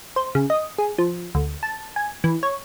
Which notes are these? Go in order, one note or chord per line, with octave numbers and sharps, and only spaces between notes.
C5
C#3
D#5
G#4
F3
D2
A5
G#5
E3
C#5